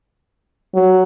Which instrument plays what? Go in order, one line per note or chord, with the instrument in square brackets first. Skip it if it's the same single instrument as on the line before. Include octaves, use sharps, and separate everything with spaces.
[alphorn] F#3